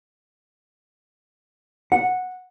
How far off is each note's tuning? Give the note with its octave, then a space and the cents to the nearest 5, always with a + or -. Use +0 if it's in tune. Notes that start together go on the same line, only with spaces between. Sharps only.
F#5 -10